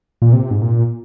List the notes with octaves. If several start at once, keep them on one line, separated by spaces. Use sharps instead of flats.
A#2
C3
G#2
A#2